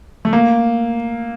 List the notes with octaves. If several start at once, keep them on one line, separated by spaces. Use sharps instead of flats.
A3
A#3